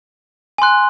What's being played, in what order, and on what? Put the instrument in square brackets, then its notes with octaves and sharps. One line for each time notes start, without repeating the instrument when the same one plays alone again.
[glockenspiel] G#5 C6 F#6